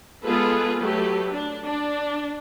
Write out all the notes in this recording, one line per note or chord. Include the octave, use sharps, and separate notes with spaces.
G#3 B3 F4 G#4 A4 B4
F#3 A3 G4 A4 B4
D4
D4